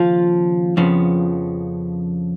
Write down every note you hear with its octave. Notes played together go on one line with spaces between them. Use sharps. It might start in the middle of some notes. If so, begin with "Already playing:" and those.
Already playing: D#2 C#3 F3 F4
F2 C#3 F3 B3